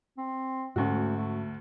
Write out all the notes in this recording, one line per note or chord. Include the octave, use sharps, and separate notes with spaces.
C4
D2 G#2 A3 C#4 F#4
A3